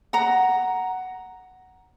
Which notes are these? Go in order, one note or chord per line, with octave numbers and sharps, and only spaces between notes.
F#5 A#5